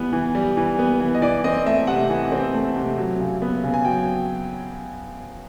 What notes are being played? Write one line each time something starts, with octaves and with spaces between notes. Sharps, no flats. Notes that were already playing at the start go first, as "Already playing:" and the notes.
Already playing: E3 G3 B3
E3
G3
E3
B3
E3
D#5
E3 D5
C4 D#5
A3 E5
C3 F#5
E3
C4
A3
C3
F#3
C#3
B3
C#3
G#5
F#3 G5